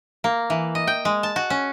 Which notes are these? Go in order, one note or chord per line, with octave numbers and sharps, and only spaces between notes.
A#3
E3
D#5
G5
G#3
A5
F#4
C#4